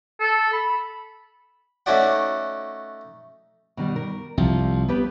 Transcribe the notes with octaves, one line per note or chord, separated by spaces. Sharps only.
A4
B5
A3 C#4 D#4 F#4 D5 F#5
B2 D#3 G3
A#4
C2 F3
B3 G4 B4